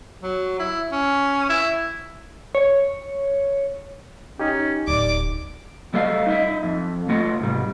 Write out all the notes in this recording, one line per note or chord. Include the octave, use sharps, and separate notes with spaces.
F#3
E4
C#4
E4
C#5
C#4 D#4 G4
D1 D5 D6
G3 A3 A4 D#5 F5
D#4 D#5 E5
F2
A3 F4 D#5 F#5
G#2 C3 G3